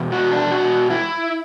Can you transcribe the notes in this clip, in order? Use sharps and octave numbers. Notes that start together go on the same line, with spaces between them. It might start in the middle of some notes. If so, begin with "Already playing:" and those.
Already playing: E2 B2
F#4
D4
F#4
E4